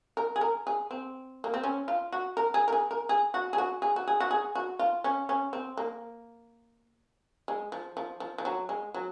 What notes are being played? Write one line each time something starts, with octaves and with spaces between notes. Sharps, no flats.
A#4
G#4
A#4
G#4
C4
A#3
C4
C#4
F4
F#4
A#4
G#4
A#4
G#4
A#4
G#4
F#4
G#4
F#4
G#4
F#4
G#4
F#4
G#4
F#4
F4
C#4
C#4
C4
A#3
G#3
F3
F3
F3
F3
F#3
G#3
F#3